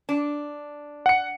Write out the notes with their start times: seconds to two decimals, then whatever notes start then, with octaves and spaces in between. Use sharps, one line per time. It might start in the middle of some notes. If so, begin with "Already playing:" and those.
0.09 D4
1.06 F#5 C#7